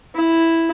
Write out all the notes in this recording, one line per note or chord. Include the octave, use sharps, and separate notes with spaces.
E4